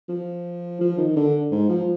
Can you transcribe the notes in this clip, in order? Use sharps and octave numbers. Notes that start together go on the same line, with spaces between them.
F3
F3
D#3
D3
G#2
F3